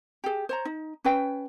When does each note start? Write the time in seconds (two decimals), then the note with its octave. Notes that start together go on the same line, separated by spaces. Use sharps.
0.24 G4 G#4
0.49 C5 C#5 A#5
0.65 D#4
1.04 C#4 B4 G5